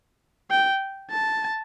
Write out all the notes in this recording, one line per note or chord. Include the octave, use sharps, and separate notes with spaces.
G5
A5